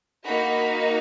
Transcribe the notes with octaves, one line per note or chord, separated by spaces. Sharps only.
A#3 D#4 F#4 B5